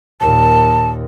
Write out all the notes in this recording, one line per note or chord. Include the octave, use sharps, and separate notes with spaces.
D#2 A#2 A5